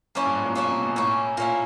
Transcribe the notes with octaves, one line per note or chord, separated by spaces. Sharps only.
F#2 A#3 C#4 E4
G2
G#2
A#2
B2 A#3 C#4 E4
C3
B2
A2 A#3 C#4 E4
A#2 A#3 C#4 E4